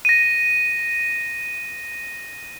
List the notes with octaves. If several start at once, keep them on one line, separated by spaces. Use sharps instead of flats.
A#6 D#7